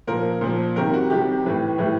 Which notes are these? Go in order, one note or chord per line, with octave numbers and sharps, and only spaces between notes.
A#2 F3 A#4
A#2 F3
C3 D#3 G3 A#4
F#4
C3 D#3 G3 G4
A2 E3 G3
A2 E3 G3